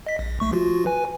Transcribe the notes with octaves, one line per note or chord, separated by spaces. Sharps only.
D#5 B6
A#1
B1 A3 C#6
F3 F4 F#4
B4 G#5